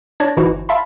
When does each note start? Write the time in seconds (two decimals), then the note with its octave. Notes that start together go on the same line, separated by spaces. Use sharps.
0.20 D4 C#5 D5 A5 G#6 A#6
0.37 G1 E3 D#4 E4 F#4 C5
0.69 E5 F5 A5 B5 C6